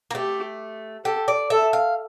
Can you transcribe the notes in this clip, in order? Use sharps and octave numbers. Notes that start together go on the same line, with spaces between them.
A#3
A3 G4
G4 A4
D5
A4 E5
F5